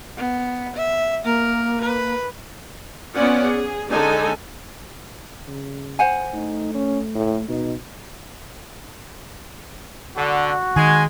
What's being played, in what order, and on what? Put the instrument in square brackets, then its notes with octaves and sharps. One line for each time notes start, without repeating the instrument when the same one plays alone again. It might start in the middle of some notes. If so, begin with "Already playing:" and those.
[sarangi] B3
E5
[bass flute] A#3 [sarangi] A#4
[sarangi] B4
[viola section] B3 C#4 F4 D5 F#5
G#4
D3 G#3 C#4 D#4 A4 G#5
[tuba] C#3
[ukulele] C5 F#5 G#5
[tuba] A3 [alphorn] D#4
[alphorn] C#4
A2
[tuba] B2 [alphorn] D#4
[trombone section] D3 [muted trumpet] F#4
[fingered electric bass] D#3 [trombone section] G#3 [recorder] G#5